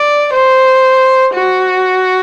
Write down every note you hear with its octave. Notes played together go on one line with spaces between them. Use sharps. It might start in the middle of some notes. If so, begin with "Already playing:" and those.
Already playing: D5
C5
F#4